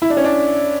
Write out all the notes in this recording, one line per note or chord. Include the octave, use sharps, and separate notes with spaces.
E4
D4
C#4
D4